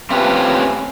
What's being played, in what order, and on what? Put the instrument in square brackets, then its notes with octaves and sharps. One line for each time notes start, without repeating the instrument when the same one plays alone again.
[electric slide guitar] A3 C4 C#4 F4 G4 B4